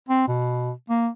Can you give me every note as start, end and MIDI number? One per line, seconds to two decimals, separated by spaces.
0.09 0.27 60
0.28 0.72 47
0.89 1.09 58